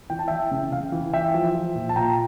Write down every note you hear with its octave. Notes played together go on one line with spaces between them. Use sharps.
E3 G5
A5
E3 E5 G5
C#3
C#3 F5
E3
E3 E5 G5
F3
F3
A#2
A5
A#2 G5 A#5